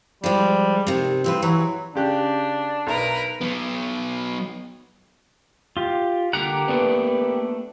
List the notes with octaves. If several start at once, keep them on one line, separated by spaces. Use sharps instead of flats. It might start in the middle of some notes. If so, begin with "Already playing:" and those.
F3 G3 G#3
C3 D#3
G2 C4 G4 B4
E3 F#3
C#3 D4 G4 F#6
B1 A#4 B4 A#5
F#3 B3
F4 G4
D3 A#3 G4 F#5 A#5
A3 B3 D4 B4